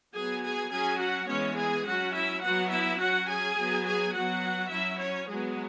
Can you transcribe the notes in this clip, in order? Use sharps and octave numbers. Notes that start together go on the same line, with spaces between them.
F#3 B3 G#4 G#5
G#4 G#5
F#3 C#4 G#4 G#5
F#4 F#5
E3 G#3 B3 C#4 C#5
G#4 G#5
F#3 C#4 F#4 F#5
E4 E5
F#3 B3 F#4 F#5
E4 E5
F#3 C#4 F#4 F#5
G#4 G#5
F#3 B3
G#4 G#5
F#3 B3 F#4 F#5
F#3 C#4 E4 E5
C#4 C#5
F#3 G#3 B3 G#4